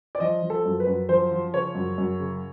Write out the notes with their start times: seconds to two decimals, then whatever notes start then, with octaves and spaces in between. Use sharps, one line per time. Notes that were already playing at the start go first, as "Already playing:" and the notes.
0.15 D5
0.20 F3 D#5
0.42 F3
0.50 A4
0.65 F#2
0.80 B4
0.87 F#2
1.09 F3 C5
1.32 F3
1.53 C#3 C#5
1.75 F#2
1.98 F#2
2.20 C#3